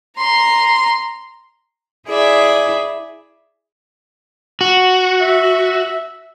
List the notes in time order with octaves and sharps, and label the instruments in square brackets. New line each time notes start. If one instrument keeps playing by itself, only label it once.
[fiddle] A#5 C6
[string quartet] E4 G#4 D5 E5
[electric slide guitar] F#4
[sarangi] E5